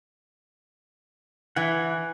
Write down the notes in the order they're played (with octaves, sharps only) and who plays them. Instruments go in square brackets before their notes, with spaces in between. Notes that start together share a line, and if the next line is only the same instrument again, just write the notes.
[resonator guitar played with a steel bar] E3 [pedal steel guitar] F#5 G#5